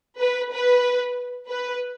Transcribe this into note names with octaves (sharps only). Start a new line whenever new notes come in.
B4
B4
B4